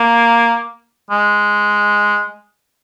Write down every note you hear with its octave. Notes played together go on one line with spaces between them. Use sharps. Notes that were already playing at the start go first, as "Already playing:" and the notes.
Already playing: A#3
G#3